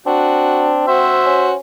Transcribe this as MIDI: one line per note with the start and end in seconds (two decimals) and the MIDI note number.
0.06 1.18 60
0.06 0.85 62
0.06 0.71 66
0.88 1.53 66
0.88 1.55 72
0.88 1.53 76
1.26 1.58 61